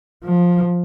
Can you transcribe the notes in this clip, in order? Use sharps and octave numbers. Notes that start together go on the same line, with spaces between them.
F3